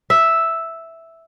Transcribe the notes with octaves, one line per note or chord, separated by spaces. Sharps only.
E5